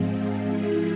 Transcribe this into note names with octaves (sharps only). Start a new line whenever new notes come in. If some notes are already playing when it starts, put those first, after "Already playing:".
Already playing: G#2 F3 G#3 C4
F3 G#3 E4 G#4